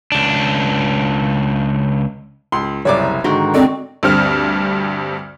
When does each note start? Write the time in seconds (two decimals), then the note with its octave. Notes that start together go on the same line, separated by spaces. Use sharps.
0.12 C#2 D4
2.52 C#2 C6
2.85 F#1 C2 C#5 D5 D6
3.24 G#2 D3 D#3 F#4 A#4 C6
3.54 C4 A4 D5 D#5
4.03 D2 G2 C4 F6